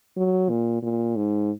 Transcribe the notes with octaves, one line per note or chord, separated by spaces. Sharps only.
F#3
A#2
A#2
G#2